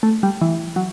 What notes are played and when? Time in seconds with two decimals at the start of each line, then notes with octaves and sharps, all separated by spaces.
0.03 A3
0.23 G3
0.41 E3
0.76 F#3